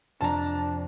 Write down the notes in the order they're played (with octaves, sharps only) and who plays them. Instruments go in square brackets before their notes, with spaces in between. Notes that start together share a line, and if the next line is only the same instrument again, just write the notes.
[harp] F2 C3 [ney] D4 [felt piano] A5 A#5